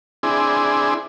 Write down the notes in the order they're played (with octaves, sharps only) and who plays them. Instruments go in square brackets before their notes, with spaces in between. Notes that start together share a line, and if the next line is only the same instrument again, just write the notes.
[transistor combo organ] C4 D4 E4 G#4